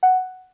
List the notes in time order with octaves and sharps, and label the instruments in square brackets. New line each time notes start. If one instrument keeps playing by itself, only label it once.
[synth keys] F#5